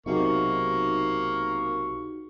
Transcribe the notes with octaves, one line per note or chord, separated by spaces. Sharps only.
B1 C3 A#3 D#4 F#4 G#4 C#6